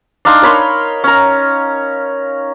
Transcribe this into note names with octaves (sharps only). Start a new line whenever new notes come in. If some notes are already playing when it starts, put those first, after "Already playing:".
D4 D#4 F5 C6
A#4 C#5 B5 C6
C#4 A#5